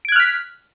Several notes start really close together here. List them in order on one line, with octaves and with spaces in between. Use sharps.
D7 G#6 F#6 F6 B6